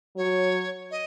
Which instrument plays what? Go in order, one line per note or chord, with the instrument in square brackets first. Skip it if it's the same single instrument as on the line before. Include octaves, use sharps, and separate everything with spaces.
[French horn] F#3 [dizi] C#5
[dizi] D#5